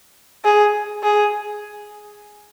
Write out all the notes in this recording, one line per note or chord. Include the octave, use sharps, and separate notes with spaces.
G#4
G#4